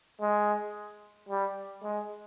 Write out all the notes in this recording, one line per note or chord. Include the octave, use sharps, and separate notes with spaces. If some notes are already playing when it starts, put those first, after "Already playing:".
G#3
G3
G#3